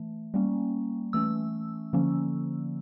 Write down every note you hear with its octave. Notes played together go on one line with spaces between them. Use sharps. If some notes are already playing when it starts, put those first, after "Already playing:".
Already playing: E3 A3
G3 A#3 C#4
E3 A3 C#4 E6
D3 F3 A#3 C#4